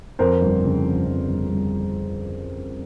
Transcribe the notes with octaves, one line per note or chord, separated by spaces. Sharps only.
F2 A#4 C5
G1
C#3
F2
F2
G1
G1